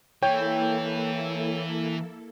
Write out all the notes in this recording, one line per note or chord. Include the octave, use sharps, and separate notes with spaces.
E3 A#3 E4 A4 C#5 G5